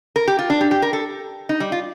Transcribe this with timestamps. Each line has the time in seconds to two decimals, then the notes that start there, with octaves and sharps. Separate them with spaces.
0.16 A#4
0.28 G4
0.39 F4
0.50 D4
0.61 G4
0.71 G4
0.82 A#4
0.93 A4
1.49 D#4
1.60 G3
1.72 F4